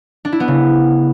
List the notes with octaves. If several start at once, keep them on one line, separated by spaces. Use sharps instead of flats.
D4
E4
B3
C#3